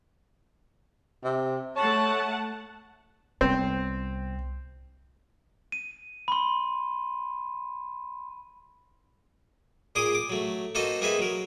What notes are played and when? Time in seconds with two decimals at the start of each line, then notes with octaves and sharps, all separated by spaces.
1.24 C3
1.76 A3 C#5 F#5 A5
3.41 C2 B3 C4
5.72 D#7
6.28 B5 C6
9.95 A#2 G#4 C6 D6 D#6
10.15 D6
10.30 F#3 A3
10.75 A#3 D#4 F#4 A4 C5 D#5
11.01 A#3 C4 D#4 G#4 B4 E5
11.19 F#3 A#4